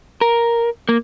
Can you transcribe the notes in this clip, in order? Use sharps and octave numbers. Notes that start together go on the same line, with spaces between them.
A#4
A#3